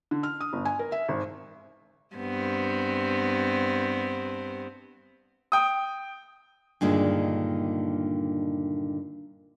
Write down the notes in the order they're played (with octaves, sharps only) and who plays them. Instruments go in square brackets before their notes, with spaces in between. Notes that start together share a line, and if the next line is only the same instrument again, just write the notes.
[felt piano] D3
F6
D#6
G1
G#5
A#4
E5
G#1
[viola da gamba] G2 B3 C4
[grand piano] G5 D#6
[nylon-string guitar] G2 A#2 D3 D#3 G#3